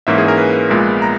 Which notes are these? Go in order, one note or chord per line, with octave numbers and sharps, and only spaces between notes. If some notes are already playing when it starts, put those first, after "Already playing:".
G#2 E3 A#3 C#4 E5
G#4
A#4
B4
A#1 A#2 G#3 B3
A#5